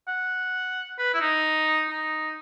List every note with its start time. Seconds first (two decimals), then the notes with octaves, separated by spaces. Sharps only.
0.08 F#5
0.99 B4
1.14 E4
1.20 D#4
1.89 D#4